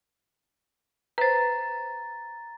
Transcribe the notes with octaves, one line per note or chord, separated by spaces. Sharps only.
B4 C5 A#5 A6